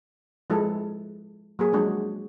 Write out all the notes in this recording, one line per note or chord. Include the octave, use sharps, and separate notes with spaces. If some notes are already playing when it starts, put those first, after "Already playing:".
F3 G#3 E4 A4
F#3 A#3 G#4
F3 F#3 G#3 D4 F#4